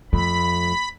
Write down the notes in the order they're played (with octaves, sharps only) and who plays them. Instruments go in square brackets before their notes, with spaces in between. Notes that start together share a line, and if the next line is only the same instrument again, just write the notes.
[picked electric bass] F2 [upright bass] A3 [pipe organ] B5